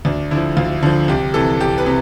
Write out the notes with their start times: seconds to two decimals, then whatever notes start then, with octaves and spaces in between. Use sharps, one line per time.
0.05 D2 D4
0.31 D3 F3 E4
0.56 D2 F4
0.82 D3 F3
1.08 C2 G4
1.34 C3 E3 A4
1.60 C2 G4
1.78 B4
1.86 C3